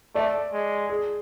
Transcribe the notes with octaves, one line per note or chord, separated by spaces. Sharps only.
A3 D5
G#3
G#4